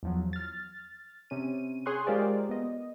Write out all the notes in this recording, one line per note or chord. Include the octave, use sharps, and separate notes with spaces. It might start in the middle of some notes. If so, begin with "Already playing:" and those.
E2 F3 F#3
F6 A6
C3 C#4 D#7
G#4 C#5 C6 C#6 F#6 G6
G#3 F4 G4 A#4 C5 D5
B3 D#5